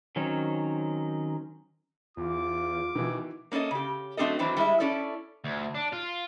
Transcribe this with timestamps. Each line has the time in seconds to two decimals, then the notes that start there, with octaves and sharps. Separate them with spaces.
0.16 D#3 F#3 C4 C#4 D#4
2.17 E2 F4 D6
2.95 B2 D#3 E3
3.52 A#3 C#4 E4 A4 D#5
3.71 C#3 G4
4.17 F#3 A3 C4 D4 A4 D#5
4.39 D#3 E3 F#3 C4 D4
4.57 G3 G#3 E4 E5
4.80 C#4 E4 A4 D5
5.44 D2
5.75 D4
5.93 F4